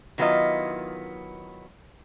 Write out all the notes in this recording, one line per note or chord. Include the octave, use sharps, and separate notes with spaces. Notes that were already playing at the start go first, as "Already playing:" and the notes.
D#3 F#3 B3 E4 F4 D#5